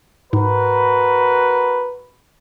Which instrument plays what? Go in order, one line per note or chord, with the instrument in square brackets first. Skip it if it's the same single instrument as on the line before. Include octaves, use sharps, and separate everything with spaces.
[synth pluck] G#2 [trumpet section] F#4 A#4 B4